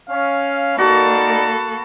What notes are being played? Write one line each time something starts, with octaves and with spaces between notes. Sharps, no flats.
C#4 F5
A#3 D#4 F#4 A4 A#4 D5 B5